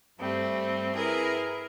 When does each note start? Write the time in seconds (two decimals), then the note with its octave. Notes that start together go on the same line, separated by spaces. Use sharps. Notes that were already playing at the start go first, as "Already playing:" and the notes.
0.19 G2 G3 A3 C4
0.95 E4 G#4 A#4 B4